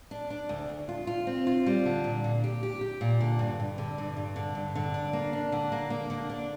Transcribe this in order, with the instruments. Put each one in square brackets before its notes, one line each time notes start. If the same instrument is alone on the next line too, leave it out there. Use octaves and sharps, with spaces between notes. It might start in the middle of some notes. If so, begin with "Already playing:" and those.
[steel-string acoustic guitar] D4
D4
D2
D2
F4
F4
C4
F4
G3
D3
A#2
A#2
G4
G4
G4
A#2
D3
G2
G2
D3
G2
G2
D3
G2
D3
D4
A#3
D4
D3
A#3
A#3
D3
D4